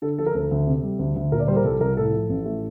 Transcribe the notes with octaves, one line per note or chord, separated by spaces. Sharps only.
D3 A4
F3 A4
A#4
D2 A4
D2
C3
G3
D2
D2
A#2 A#4
D5
G3 C5
A#4
C2 A4
C2 A#4
A2 A4
F3
A1
A3